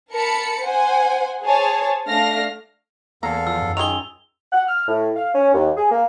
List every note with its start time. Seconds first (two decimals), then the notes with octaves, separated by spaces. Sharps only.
0.12 A#4 A5 B5 C#7
0.61 C5 F#5 G#5
1.44 G#4 C5 C#5 A5
2.08 A3 D4 F5 F6 A#6
3.23 E2 A#3 A4 F5 A#5
3.47 F3 E6
3.62 F#2
3.77 D#3 F4 G#4 F7 G7
4.53 F#5
4.68 F6
4.88 A2
5.16 F5
5.34 C#4
5.54 D#2
5.77 G#4
5.91 A#3